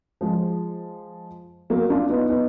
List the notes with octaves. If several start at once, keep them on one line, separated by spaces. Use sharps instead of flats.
F3 G#3
F#3 A#3
D4 F4
B3 D#4
B3 D#4